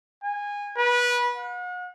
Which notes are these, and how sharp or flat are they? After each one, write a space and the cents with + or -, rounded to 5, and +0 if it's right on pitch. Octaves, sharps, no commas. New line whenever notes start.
G#5 -20
B4 -25
F#5 -40